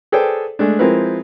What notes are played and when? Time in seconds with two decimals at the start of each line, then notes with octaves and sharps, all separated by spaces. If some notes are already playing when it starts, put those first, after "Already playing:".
0.12 G#4 A4 B4 C5 D5 G5
0.59 G#3 A3 D4
0.79 F3 G#3 C4 E4 A#4 B4